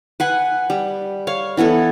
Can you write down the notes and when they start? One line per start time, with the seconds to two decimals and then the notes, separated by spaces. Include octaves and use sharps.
0.20 B4 F#5 G#5
0.70 G3
1.27 C#5 F5
1.57 E3 B3 E4 A4